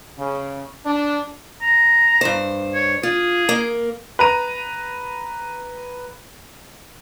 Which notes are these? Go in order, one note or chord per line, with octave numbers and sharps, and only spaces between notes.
C#3
D4
A#5
G2 C5
C#5
F4 G#4
A#3
B4 A#5 D#7